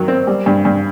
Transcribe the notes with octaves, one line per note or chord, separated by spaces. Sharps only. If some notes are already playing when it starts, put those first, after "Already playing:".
Already playing: D#3 F#3
C4
G3
G2
G2